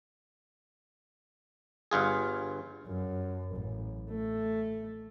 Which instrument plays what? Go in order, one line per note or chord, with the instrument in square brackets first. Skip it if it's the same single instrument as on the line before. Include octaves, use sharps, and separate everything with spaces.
[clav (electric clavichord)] G1 G2 F4 G#4
[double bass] F#2
A1
A3